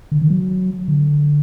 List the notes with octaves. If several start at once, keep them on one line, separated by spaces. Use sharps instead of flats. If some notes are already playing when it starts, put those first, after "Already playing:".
D3
D#3
F#3
D3